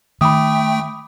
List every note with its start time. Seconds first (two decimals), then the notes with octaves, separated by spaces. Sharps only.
0.21 D#3 A3 G5 B5 D6 D#6